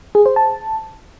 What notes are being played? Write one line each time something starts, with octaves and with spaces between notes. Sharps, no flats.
G#4
C5
A5